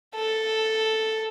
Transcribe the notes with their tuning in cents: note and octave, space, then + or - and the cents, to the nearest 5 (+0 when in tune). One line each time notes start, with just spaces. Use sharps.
A4 +0